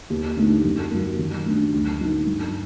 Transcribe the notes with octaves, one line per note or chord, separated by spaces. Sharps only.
D#2
D3 A3 D#4
F#2
F#3 A#3
D#3
F#3 A3 D4
D2
D3 F#3 A#3 D#4
G2